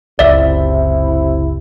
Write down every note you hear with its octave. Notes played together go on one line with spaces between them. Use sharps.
F#1 C#2 C3 E4 D5 E5